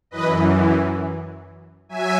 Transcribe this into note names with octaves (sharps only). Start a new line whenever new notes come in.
F#2 E3 B4 D#5
F#3 E5 G#5